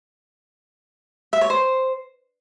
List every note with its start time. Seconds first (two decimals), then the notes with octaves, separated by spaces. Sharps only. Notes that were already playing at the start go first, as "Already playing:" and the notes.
1.33 E5
1.41 C#5
1.50 C5